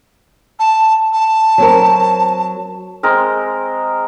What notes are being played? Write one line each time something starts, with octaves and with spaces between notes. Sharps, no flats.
A5
A5
F#3 C4 A#4
G#3 C4 A#4